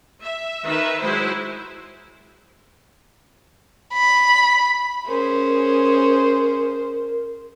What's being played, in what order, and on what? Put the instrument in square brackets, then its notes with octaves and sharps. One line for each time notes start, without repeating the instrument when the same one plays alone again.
[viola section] E5
D#3 B4 E5
F#3 G#3 E4 C5
[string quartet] B5
[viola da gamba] C#4 G#4 [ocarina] A#4 [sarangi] C5